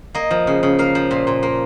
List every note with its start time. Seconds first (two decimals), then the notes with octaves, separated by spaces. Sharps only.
0.14 A#3 D#5
0.31 F3
0.47 C#3
0.63 C#3
0.79 A#3 F5
0.95 F3
1.11 A#2
1.27 A#2
1.43 A#3